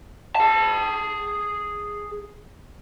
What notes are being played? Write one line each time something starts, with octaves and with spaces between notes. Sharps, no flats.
G#4 A5